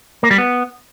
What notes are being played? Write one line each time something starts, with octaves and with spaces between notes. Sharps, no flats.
A#3
G3
B3